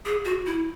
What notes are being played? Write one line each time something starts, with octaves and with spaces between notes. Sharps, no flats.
G#4
F#4
E4